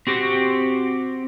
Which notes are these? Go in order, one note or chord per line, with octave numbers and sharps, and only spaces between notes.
C4 F#4 G4